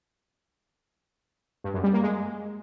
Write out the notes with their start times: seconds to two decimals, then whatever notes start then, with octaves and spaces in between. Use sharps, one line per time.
1.64 G2
1.74 F#2
1.84 G3
1.93 A#3
2.03 G#3